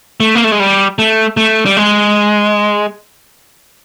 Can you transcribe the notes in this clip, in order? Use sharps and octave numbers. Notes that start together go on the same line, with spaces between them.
A3
A#3
A3
G#3
G3
A3
A3
G3
G#3